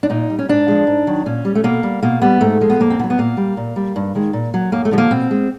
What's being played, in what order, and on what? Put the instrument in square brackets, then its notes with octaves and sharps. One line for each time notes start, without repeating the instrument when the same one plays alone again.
[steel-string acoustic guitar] D4
A#2 D#4
G3
C#4
G#2 D4
F3 G#3
G#2
D#3 F#3
A#2 C#4
G3
A3
B2 A#3
G3
B2 A#3
G3 B3
G#2 A3
F3 G#3
B3
F2 A#3
C4
D3 B3
F#3
B3
A#2 A#3
G3
A#2
G3
G2
D#3 G#3
A#2
F#3
F#2 A#3
A3
D3 F3 G#3
A#3
B2 C4
G#3